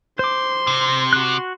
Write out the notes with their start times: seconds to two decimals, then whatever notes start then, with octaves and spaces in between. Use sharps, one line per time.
0.19 C5 C6 D6
0.67 C3
1.13 F#4 F#6